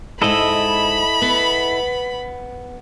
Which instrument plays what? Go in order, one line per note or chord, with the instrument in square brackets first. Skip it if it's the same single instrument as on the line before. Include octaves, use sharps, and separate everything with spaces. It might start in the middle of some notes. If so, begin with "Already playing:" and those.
[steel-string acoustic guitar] G#2 G#3 [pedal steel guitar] E4 A4 D#5 [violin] B5
[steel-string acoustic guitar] B3